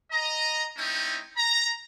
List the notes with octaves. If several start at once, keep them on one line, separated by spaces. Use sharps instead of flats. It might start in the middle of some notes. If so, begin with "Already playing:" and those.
D#5 A#5
A3 C4 C#4 D#4 E4 G5
A#5